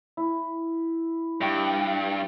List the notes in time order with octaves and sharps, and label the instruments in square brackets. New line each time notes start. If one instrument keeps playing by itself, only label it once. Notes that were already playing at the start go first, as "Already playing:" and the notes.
[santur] E4
[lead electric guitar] G2 [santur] E5 G5 C#6